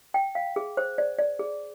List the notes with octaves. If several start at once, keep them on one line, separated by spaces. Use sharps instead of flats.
G5
F5
G#4
C5
D5
D5
G#4